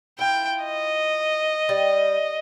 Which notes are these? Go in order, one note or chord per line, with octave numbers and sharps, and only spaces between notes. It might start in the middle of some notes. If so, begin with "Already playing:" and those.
E4 F4 G5
D#5
G3